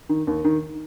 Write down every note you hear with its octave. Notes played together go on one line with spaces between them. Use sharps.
D#3
D#2
D#3